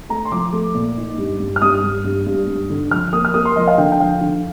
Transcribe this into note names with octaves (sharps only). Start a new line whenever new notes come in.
A3 A#5
C6
F3 D6
A3
A#2
D#4
G2
G2
F6
G2 D#6
G2
G2
G2
G2
D3
F3 F6
A#3 D#6
F6
A#3 D#6
C6
F3 D#5
F5
D3 G5
G5
F3 F5
D3